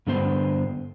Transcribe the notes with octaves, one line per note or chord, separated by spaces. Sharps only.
G2 D3 B3 C5